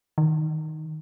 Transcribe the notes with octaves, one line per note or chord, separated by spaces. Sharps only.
D#3